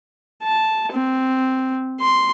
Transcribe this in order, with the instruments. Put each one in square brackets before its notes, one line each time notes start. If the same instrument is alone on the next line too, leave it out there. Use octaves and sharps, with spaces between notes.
[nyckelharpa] A5
C4
C6